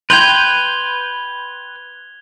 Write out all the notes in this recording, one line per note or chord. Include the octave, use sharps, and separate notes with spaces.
B4 G5 C6 G6 G#6 F7 G7